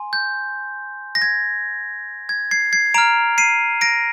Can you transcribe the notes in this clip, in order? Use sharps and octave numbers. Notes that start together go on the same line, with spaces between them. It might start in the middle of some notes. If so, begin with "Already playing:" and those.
Already playing: G#5 C6
G6
A#6
G#6
G#6
G#6 C7
G#6 C7
A#5 F6 D7 F7
C7 D#7
A#6 D7